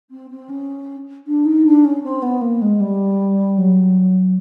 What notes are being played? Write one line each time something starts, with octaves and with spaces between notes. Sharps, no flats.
C4
C4
C#4
D4
D#4
D4
C#4
C4
B3
A#3
G#3
G3
F#3